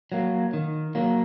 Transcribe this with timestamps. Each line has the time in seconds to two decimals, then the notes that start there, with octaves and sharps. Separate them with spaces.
0.12 F#3 A#3
0.53 D#3
0.95 F#3 A#3